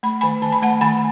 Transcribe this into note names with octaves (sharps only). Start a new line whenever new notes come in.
A3 B5
D#3 G#5 B5
D#3 A5
B5
A3 F#5 A5
D#3 G#5 B5